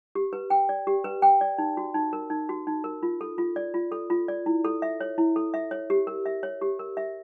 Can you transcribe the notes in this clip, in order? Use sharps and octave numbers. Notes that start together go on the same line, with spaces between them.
G4
B4
G5
D5
G4
B4
G5
D5
D#4
F#4
D#4
A#4
D#4
F#4
D#4
A#4
F4
A4
F4
D5
F4
A4
F4
D5
E4
A4
E5
C#5
E4
A4
E5
C#5
G4
A#4
E5
C#5
G4
A#4
E5